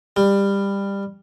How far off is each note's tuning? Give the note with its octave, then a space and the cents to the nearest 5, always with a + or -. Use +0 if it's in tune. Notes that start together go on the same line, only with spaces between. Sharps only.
G3 +20